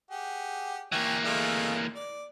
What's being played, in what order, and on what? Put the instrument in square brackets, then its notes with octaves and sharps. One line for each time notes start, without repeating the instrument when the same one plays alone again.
[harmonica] G4 G#4 F#5
[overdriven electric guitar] E3 A#3 [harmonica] G4 C#5 G#5
[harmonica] G#3 A3 F5
D5